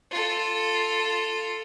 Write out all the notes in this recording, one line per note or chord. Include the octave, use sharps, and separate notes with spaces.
F4 A4